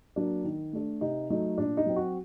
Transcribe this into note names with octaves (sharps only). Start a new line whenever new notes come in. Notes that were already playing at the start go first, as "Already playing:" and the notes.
F#3 A#3 D4
D#3
A3 D4
C3 D#4
F#3 A3 D#4
A#2 D4
D#4
F#3 C4
F#4